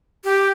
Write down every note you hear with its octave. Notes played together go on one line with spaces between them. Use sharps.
G4